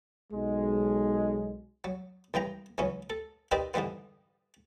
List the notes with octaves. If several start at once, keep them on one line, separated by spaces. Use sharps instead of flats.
B1 G#3
F#3
C2 E3 G5 A#5
C#2 E3 F#3 C#4
A4
C4 D#4 G4 A#4 B4 D5
G#2 D3 E3 G3 B3